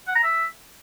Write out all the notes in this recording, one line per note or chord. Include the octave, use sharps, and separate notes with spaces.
F#5
A#5
E5